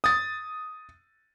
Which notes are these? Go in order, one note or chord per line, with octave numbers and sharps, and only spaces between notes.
D#6 A6